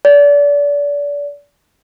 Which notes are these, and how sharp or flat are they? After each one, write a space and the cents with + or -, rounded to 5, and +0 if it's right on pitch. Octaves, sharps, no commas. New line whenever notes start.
D5 -30